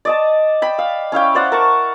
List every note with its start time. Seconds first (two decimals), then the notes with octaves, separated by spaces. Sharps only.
0.05 D5 D#5 A5
0.62 G5 B5
0.79 F5
1.12 C#4 E4 F5 G5
1.35 C5 D5 F#5
1.52 A#4 A5 C#6